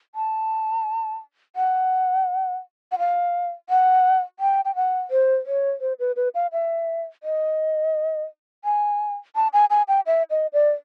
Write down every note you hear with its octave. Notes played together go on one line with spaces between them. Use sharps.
A5
F#5
F#5
F5
F#5
G5
G5
F#5
C5
C#5
C5
B4
B4
F5
E5
D#5
G#5
A5
G#5
G#5
G5
E5
D#5
D5